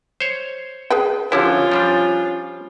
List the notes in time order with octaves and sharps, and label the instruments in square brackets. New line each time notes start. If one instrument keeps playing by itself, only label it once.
[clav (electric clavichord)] C5 C#5
[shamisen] G#4 B4 G5
[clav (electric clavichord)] D3 F3 E4 [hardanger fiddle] C#4 F4 [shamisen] G4 C#5
[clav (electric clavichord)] F3 G3 D4